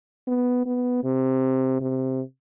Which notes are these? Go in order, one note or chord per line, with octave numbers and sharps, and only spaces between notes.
B3
B3
C3
C3